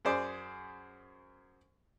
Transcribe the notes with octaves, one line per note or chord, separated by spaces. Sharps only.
F#2 G#4 C5 D5